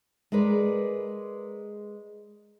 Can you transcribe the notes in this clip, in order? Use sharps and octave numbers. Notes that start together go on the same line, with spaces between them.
G#3 A#4 B4 D5